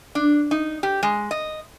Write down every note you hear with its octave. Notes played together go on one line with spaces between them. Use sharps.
D4
D#4
G4
G#3
D#5